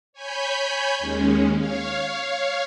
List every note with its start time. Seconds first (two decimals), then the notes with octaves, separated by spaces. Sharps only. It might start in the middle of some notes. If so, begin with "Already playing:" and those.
0.13 C#5 G#5 B5 G6
0.99 D#2 G#3 C#4
1.56 C#5 F5